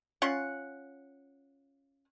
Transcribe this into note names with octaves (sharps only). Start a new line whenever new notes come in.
C#4 F4 F#5